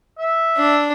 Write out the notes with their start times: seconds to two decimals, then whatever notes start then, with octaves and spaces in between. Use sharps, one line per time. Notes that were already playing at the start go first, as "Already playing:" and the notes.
0.19 E5
0.58 D4